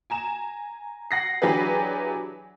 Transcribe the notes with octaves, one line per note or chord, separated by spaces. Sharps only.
G#5 A#5 E7
F#5 A#6 C7
E3 F#3 D4 G4 G#4 B4